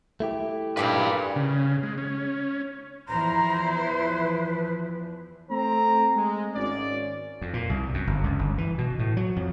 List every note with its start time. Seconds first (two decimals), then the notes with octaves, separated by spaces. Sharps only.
0.20 A3 E4 G4
0.77 G2 A#2 C#3 B4 D5 F5
1.36 C#3
1.83 G#3
1.98 C#4
3.08 E2 E3 F3 E4 C5 A#5
3.74 B4
5.50 A3 C4 C5 A#5
6.15 G#3
6.55 G#1 C#4 D5
7.42 F2
7.53 A#2
7.70 C2
7.94 F#2
8.07 G1
8.24 C#2
8.39 G1
8.58 E3
8.78 B2
8.99 A2
9.17 F#3
9.36 F2